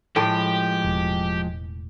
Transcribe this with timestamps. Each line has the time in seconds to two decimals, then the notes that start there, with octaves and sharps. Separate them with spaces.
0.16 A2 F3 G#3 G4 G5
0.84 E1